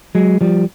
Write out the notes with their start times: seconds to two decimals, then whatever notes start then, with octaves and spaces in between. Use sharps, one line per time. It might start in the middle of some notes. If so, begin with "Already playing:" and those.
0.15 F#3 G#3
0.41 F3 G3